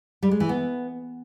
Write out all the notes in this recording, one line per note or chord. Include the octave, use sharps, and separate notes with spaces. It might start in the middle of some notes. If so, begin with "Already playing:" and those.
G3
G#3
E3
B3